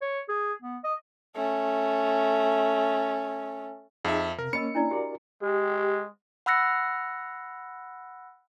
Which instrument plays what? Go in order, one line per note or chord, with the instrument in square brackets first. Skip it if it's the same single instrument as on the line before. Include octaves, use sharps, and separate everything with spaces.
[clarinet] C#5
G#4
B3
D#5
[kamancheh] A3 C#4
[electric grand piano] F2 E5 [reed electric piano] D#4 G#4 [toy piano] F5 A5
[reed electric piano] C3 [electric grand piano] A#4
[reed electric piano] A#3 C#4 [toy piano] A#4 D#5 B5 [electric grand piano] C#7
[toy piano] D4 E4 D5
[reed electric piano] F#4 A#4 D5 [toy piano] G4
[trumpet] G#3 [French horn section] G4
[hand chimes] F#5 B5 E6 F#6 A#6 C#7